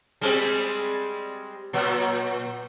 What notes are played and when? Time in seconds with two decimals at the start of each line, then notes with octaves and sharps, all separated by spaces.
0.21 G3 G#3 C4
1.73 A#2 F#3